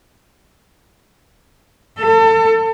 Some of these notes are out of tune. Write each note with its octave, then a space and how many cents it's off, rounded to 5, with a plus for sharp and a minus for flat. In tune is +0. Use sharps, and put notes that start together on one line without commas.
A4 +35